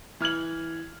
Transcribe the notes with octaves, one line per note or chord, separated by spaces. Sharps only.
E3 F6 G#6 F#7